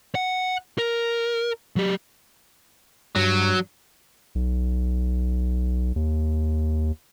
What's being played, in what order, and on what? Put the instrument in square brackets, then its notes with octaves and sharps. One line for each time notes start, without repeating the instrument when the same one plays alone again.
[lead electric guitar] F#5
A#4
F#3 G4
[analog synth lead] G2 [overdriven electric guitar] F#3
[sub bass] B1
D#2